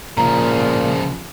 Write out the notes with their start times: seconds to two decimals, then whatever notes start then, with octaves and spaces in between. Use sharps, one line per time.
0.17 A#2 C#3 F3 A#5